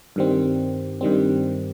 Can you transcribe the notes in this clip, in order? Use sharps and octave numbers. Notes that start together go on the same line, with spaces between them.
G2 D#3 G3 C4
G2 D#3 G3 C4